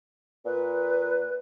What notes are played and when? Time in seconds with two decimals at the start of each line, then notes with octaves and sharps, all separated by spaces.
0.45 A#2 B4